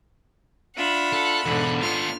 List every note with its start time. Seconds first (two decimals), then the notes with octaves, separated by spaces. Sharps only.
0.77 D4 F4 E5 F#5 B5
1.13 A4
1.46 E2 G#2 B2 D3
1.81 B3 D4 F4 F6